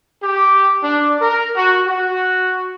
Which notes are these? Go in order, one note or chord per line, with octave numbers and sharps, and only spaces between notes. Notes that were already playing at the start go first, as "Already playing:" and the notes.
G4
D4
A#4
F#4
F#4